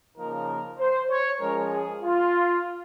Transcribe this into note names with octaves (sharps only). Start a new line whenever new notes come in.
C#3 F3 A#3 D#4 A#4
C5
C#5
F3 G#3 C#4 A#4
G#4
F4